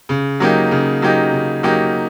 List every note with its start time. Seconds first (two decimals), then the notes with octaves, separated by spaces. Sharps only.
0.09 C#3
0.40 F#3 A#3 D#4 G4
0.71 C#3
1.02 F#3 A#3 D#4 G4
1.33 C#3
1.63 F#3 A#3 D#4 G4